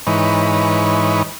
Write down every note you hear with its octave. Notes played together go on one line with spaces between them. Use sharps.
G#2 E3 D#4 B4 C#5